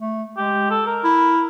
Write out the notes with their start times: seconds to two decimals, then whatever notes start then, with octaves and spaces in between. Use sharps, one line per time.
0.01 A3
0.37 G#3 G4
0.70 A4
0.86 A#4
1.04 E4